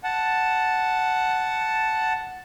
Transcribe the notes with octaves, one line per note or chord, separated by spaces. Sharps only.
F#5 A5